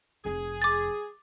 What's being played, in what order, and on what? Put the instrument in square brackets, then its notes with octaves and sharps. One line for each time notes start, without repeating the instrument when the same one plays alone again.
[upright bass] F1 F2 [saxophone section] G#4
[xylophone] D6 A6